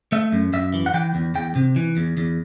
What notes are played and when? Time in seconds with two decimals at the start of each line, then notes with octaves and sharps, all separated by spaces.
0.12 A3 E5
0.32 F#2
0.53 F#2 E5
0.74 E3
0.86 F#5
0.94 E3 G5
1.15 E2
1.35 E2 G5
1.56 C3
1.76 E3
1.97 E2
2.17 E2